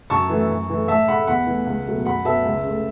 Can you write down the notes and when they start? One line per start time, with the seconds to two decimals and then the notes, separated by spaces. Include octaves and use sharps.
0.10 F#2 A5 C#6
0.30 E3 A3
0.50 F#2
0.69 E3 A3
0.88 A2 E5 A5
1.08 A3 F#5 B5
1.27 E2 F#5 B5
1.47 E3 A3
1.66 C#2
1.87 B2 F#3 A3
2.05 F#2 F#5 B5
2.25 F#3 B3 E5 A5
2.45 C#2
2.64 C#3 A3